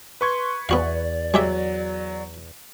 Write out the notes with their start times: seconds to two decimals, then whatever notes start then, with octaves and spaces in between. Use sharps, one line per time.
0.21 B4 C6 C#6 G#6
0.69 E2 B3 F#4 D5 F5
1.34 F#3 G#3 G4 E5